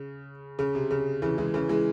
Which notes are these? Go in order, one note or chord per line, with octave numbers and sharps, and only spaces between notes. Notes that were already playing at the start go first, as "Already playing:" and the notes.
Already playing: C#3
C#3
C3
C#3
C#3 E3
E3 G#3
C#3 E3
E3 G#3